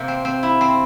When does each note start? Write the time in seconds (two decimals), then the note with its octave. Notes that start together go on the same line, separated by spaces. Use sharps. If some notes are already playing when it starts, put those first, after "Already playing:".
Already playing: C3 A#3
0.08 C4
0.25 C4
0.43 E4
0.61 C4